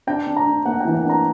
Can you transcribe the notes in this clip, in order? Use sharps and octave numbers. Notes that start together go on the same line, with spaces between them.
D4 G5
D4
A#5
D4
A#3 F#5
E3 G5
F#5
D4 A#5